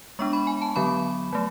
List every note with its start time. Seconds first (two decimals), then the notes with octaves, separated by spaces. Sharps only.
0.19 G#3 B3 D4 C#6
0.33 B5
0.47 G#5
0.62 A5
0.76 D3 F#3 B3 B5
1.33 F#3 A3